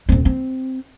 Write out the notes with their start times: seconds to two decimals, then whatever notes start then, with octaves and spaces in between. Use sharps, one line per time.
0.09 D#1 C4
0.25 C4